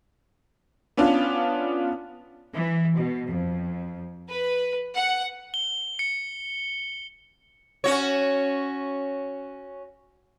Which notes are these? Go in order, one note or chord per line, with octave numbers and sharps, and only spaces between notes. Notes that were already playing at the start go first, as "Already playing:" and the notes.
B3 C#4 D4 F4
E3
B2
F2
B4
F#5
G7
C#7
C#4 F#4 C#5